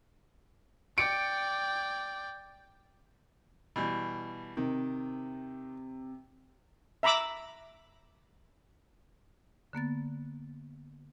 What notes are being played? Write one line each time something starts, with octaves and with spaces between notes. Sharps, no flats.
D5 G5 C#7 D7
B2 E3 G3
C3 D#3
E5 A#5 B5 D6 E6
D3 A#3 B3 A6